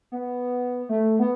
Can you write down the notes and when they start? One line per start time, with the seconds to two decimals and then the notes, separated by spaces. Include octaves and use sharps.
0.12 B3
0.89 A3
1.19 B3